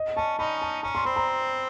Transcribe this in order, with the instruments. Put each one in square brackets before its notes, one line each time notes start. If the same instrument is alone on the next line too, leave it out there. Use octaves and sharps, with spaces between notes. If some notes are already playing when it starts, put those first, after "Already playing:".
Already playing: [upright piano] D#5
[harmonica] C#4 [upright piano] A5
[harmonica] C#4 D#4 [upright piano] B5
[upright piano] A5
[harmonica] C#4 [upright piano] A#5
[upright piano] C6
[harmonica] C4 [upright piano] B5
[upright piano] A#5